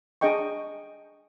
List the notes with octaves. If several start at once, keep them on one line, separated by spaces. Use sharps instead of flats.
D4 G#4 D#5 G5 C#6